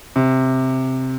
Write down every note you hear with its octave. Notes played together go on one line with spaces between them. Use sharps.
C3